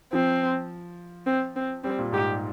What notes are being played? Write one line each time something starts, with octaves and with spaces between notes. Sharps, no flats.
F3 C4
C4
C4
G3 C4
A#2
G#2 G4